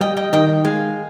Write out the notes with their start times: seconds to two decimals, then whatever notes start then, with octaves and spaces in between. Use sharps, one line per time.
0.01 G3 D#5 G5
0.17 D#5 G5
0.33 D#3 D#5 G5
0.65 G#3 F5 G#5